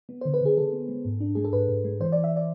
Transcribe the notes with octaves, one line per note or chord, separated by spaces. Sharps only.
B3
D3 C5
B4
D3 G#4
D3 A4
B3
G#3
G#2
D4
G#3 G#4
A4
G#2 B4
G#2
G#3
E3 C5
E3 D5
E5
D5